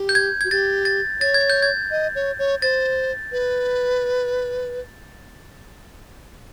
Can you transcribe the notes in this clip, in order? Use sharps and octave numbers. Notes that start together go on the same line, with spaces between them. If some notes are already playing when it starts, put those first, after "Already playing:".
Already playing: G4
G6
G#6
F#4 G#6
G4 A6
A6
C#5 A6
G#6
G6
G#6
D#5
C#5
C#5
C5 A6
B4